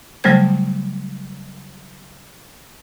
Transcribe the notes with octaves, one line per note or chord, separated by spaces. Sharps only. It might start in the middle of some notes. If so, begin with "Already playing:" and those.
C#3 F#3 G3 A3 C5 G#6